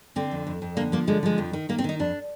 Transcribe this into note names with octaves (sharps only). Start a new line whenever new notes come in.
D3 C4
F2
F2
F2
D3 A#3
F3 A#3
D3 G#3
F3 G#3
F2
D#3
D#3 A#3
C4
D#3 D#4
F2 D4